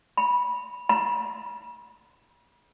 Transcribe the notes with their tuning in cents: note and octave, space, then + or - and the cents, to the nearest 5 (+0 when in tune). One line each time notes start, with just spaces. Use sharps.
B5 -15
B5 -45